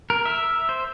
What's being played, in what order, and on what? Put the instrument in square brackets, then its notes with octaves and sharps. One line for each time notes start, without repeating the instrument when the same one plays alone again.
[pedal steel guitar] A#4
E5
C5